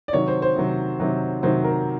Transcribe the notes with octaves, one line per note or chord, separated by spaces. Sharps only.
D5
C3 D#3 F#3 C#5
C5
C5
C3 D#3 F#3
C3 D#3 F#3
C3 D#3 F#3 C5
A#4